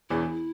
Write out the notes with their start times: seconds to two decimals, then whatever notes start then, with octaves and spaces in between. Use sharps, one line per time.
0.10 E1 E2 E3 E4